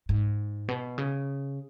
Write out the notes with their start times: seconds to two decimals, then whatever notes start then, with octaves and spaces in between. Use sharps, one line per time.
0.09 G#2
0.68 B2
0.98 C#3